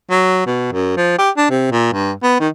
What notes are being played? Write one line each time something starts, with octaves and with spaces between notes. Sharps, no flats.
F#3
B2
F#2
F3
G4
D4
C3
A#2
G2
B3
D#3